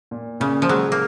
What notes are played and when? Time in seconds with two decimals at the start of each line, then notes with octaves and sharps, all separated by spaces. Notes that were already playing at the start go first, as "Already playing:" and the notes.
0.11 A#2
0.40 A#2 C#3
0.62 F3
0.69 F#3 G#3
0.92 A#3